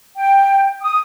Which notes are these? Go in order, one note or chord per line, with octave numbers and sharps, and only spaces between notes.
G5
D#6